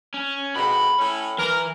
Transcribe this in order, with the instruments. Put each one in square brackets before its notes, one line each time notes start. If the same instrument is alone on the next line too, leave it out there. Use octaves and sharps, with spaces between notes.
[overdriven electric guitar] C#4
[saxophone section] F2 G#2 B2 [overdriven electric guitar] B5
[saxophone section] A2 C#4
[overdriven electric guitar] E3 [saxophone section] A#4